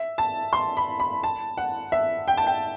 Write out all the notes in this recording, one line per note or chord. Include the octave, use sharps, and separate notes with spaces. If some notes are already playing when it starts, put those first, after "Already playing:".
Already playing: E5
A5
C6
B5
B5
A5
F#5
E5
G5
A5
G5